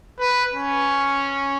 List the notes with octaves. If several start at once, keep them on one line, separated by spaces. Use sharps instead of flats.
B4
C#4